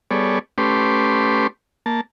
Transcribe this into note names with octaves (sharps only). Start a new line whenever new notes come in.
G3 B3 G#4 A4 C#5 D5
A3 C#4 G4 B4 C6 D6
A#3 A5